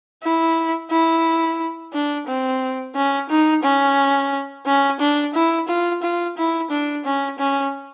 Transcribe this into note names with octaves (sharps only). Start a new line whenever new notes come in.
E4
E4
D4
C4
C#4
D#4
C#4
C#4
D4
E4
F4
F4
E4
D4
C#4
C#4